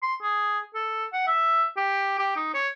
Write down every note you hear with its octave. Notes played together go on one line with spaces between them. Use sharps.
C6
G#4
A4
F#5
E5
G4
G4
D#4
C#5